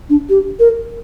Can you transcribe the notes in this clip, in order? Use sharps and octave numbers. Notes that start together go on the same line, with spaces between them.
D4
G4
A#4